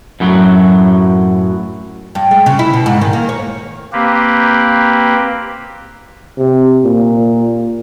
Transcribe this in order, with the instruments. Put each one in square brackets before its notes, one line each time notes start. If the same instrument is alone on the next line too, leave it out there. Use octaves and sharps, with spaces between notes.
[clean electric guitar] F#2 A2 F#3
[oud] G2
G#3
C#3
E4
B2
G#2
D#3
A#3
C#5
[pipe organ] A#3 C4 G4 B4
[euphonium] C3
A#2